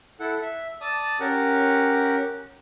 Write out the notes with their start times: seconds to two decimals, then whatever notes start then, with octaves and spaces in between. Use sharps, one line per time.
0.20 E4 A4 F#5
0.42 E5
0.81 D5 A5 D#6 E6
1.20 C#4 G4 A#4 F#5